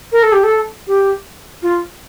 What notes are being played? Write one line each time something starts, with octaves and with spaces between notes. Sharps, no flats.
A#4
A4
G4
A4
G4
F4